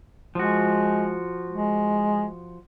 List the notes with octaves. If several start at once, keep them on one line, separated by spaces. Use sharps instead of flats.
F3 G#3 F#4
G#3